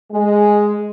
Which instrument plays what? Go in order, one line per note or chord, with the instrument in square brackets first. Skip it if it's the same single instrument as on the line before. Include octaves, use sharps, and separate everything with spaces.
[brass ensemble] G#3